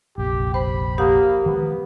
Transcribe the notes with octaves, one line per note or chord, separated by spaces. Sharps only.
F1 A#1 G4
C5 B5
A#3 G4 F#5 D#6
D#3 F3 G#3 B3